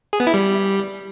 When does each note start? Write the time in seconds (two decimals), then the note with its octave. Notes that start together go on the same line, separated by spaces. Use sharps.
0.13 G#4
0.20 B3
0.27 E4
0.34 G3